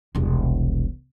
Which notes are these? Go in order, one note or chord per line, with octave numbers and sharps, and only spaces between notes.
E1 C2